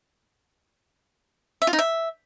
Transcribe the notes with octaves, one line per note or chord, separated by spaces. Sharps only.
E5
F4
D#4
E5